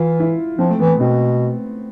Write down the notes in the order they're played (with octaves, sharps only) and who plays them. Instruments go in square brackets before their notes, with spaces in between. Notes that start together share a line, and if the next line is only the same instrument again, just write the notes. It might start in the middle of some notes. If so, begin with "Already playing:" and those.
Already playing: [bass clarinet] E3 [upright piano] F4
[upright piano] E4
[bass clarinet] F3 [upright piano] C4
[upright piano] A3
[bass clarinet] E3 [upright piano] B3
[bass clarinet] B2 [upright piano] C4